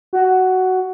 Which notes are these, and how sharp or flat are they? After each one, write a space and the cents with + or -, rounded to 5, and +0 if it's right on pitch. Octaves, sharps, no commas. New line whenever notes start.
F#4 +10